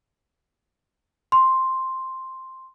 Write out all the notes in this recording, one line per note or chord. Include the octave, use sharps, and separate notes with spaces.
C6